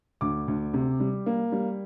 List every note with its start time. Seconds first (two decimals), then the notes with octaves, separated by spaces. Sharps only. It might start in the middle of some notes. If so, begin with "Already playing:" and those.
0.21 D2 D6
0.48 D2
0.74 C3
1.00 G3
1.26 A#3
1.52 G3